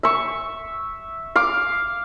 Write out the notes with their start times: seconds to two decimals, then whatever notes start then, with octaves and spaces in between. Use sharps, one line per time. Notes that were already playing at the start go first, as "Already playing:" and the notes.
0.03 E5 C#6
1.36 F5 D6